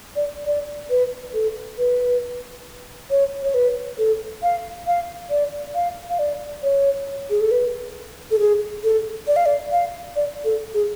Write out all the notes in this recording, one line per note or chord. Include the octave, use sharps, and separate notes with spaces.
D5
D5
B4
A4
B4
C#5
C#5
B4
A4
F5
F5
D5
F5
F5
D5
C#5
G#4
A4
B4
A4
G#4
A4
D5
F5
D5
F5
D5
A4
G#4